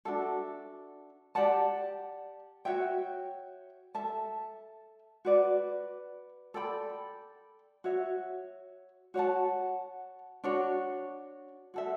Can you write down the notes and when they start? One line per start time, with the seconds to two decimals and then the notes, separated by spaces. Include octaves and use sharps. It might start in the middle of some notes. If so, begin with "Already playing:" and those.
0.05 D4 F#4 A4 E5
1.35 G4 D5 F#5 A5
2.65 F#4 C#5 E5 G5
3.95 A4 E5 A5
5.25 F#4 B4 D5
6.54 A4 D5 G5 B5
7.84 F#4 C#5 E5
9.14 F#4 C#5 F#5 A5
10.44 D4 F#4 C#5
11.74 F#4 A4 E5